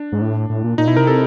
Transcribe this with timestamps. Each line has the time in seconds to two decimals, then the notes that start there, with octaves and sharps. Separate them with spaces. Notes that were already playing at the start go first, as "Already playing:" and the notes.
Already playing: D4
0.12 G#2
0.21 A2
0.50 A2
0.64 A#2
0.78 A#2 D#4
0.87 B2 E4
0.97 C3 A#4
1.07 A4